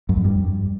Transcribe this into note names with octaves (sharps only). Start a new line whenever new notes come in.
F#2
F2
G2